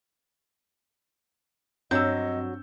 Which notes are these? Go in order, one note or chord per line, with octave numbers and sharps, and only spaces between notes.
G2 F#3 C4 D4 D#5 E6 G6